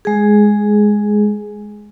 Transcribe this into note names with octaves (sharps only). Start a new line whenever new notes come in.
G#3 G#4